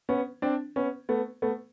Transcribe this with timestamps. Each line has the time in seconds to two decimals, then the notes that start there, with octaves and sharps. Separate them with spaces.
0.09 B3 C#4
0.42 C4 D4
0.76 B3 C#4
1.09 A3 B3
1.42 A3 B3